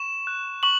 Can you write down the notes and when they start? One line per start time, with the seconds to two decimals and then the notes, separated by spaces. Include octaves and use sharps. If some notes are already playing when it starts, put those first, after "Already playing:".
Already playing: C#6 E7
0.27 F#6
0.63 C#6 F#7